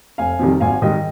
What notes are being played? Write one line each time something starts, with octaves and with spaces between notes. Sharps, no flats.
F1 F5 G#5
F2 C3 D#3 G3
G#1 F5 G#5
G#2 D#3 G3 D#5 G5